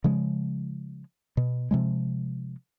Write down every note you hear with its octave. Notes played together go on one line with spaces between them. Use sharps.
C#3 F3 G#3
B2
C3 F3 G#3